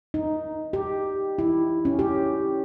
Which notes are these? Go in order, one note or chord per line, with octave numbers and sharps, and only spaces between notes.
D#4
G4
E4
C#4
G4